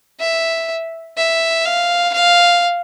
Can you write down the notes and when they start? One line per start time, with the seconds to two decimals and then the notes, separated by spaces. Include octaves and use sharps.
0.20 E5
1.17 E5
1.65 F5
2.13 F5